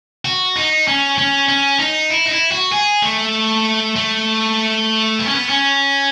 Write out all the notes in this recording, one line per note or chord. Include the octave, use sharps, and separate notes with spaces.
F#4
D#4
C#4
C#4
C#4
D#4
E4
D#4
E4
F#4
G#4
A3
A3
B3
C#4
B3
C#4